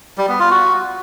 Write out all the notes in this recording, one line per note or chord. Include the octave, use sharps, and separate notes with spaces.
G3
B3
F4
F#4